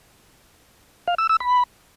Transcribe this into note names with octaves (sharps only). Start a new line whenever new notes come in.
F5
E6
E6
B5